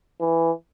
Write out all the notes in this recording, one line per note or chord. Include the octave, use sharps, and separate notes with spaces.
E3